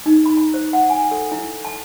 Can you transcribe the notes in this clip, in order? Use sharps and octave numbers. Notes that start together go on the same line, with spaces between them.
D#4
B5
A#5
C5
F#5
G#5
A4
E4
A5